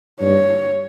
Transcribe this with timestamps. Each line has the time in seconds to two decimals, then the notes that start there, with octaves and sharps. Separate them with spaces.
0.21 G2 C#5